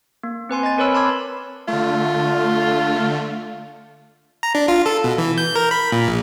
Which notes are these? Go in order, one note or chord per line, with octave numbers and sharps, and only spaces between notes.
A#3
C4 B4 G#5 C6
D#5 G#5 A6
C4 A#4 B4 C#5 B5 E6
A5 B5 C6 D6 E6 G#6
D3 A3 F4
A#5
D4
F4
A4
B2
E3
G6
A#4
B5
A#2
A#1